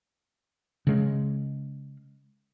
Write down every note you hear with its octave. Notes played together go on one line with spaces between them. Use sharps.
C#3 G#3